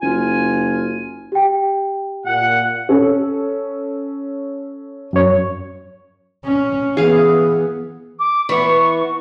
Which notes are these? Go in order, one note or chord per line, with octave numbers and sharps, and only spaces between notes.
F#1 F4 G#5
G4 G5
A#2 F#5
C#4 A4
F#2 C#5
C#4
E3 B3 G#4 F5
D6
E3 B3 C#6